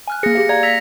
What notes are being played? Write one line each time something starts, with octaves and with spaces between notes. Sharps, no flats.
G#5 F6 F#6
A#3 G#4 A#6 C#7
G4 F5
D5 F5 A#5 G#6
E6 A#6 B6 F7